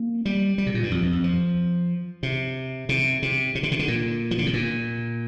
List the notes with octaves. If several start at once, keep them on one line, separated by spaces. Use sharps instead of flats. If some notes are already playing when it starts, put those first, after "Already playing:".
Already playing: A#3
G3
G3
C3
A#2
G2
F2
F2
F2
F3
C3
C3
C3
C3
D3
C3
D3
A#2
F3
D3
C3
A#2